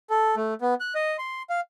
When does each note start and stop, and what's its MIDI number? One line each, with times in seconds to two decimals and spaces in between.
0.10 0.35 69
0.36 0.54 57
0.61 0.74 59
0.80 0.94 90
0.95 1.17 75
1.18 1.42 84
1.50 1.60 77